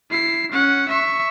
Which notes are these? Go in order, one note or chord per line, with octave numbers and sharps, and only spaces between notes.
E4 C7
C#4 F#5
E5 C#6